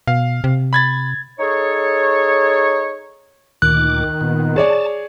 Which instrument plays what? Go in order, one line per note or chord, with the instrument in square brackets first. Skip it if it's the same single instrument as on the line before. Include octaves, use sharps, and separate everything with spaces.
[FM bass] B2 [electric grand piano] F5
[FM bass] C3
[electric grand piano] B5 G#6 A6
[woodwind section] D#4 G#4 A4 C#5
[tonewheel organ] D2 A#2 D6 [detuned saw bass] D#3 [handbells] F#6
[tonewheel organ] A#2 B3
[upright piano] G#4 C#5 D5 [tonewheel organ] A5